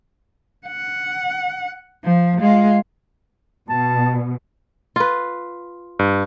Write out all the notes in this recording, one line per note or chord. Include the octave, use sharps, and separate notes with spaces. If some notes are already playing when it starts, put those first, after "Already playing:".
F#5
F3
G#3 F4
B2 A5
F4 B4
G2